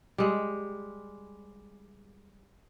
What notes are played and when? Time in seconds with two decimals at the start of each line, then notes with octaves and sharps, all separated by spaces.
0.18 G3 G#3